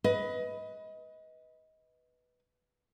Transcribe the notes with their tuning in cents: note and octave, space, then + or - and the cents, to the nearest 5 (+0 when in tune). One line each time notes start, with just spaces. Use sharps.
B4 +0 D#5 +25